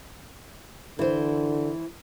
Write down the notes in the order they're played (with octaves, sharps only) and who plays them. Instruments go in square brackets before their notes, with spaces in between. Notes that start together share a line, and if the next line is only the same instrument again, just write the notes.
[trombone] D3 [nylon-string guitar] E3 C5